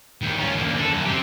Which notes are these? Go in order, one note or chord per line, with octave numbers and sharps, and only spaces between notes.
D2 D#3
C#4 F4
D2 A#3
D4 A4
F#2
C4 G4